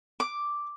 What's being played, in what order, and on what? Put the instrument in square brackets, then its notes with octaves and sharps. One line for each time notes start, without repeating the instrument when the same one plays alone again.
[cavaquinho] D6